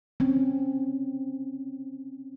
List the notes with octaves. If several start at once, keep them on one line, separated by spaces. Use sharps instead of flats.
C4 C#4